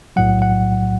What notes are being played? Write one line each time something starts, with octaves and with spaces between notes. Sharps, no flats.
B1 A2 F#3 F#5
F#5